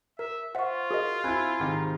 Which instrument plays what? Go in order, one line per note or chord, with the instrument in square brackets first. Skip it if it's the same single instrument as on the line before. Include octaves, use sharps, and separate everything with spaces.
[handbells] A#4 [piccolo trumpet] E5
[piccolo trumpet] F4 [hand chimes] C5 C#6 [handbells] E5 F#5
[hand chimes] F#4 [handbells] G#4 A#4 D#5
[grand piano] C4 E4 [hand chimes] G#5 B5 G#6 [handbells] F#6
[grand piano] G#2 C3 D#3